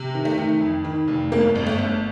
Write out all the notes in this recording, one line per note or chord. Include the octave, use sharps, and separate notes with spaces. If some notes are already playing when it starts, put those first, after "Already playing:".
Already playing: C3
D#3
A3
D#3
F2
D#3
F1
G1 A#3
G1
A3
G1